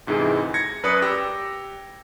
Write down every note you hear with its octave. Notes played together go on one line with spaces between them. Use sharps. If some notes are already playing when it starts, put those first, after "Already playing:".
D2 G#2 C3 E3 G#3
G#6 A#6 C#7
F#2 B4 D5 D#6 C#7
G4 E6 A#6